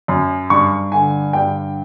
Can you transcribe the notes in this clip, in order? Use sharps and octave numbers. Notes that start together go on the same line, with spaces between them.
F#2
G2 C#6
D3 G#5
G2 G5